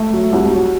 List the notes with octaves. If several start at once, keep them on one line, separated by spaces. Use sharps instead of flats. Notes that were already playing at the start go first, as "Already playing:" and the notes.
Already playing: A3
F#3
C2
F#3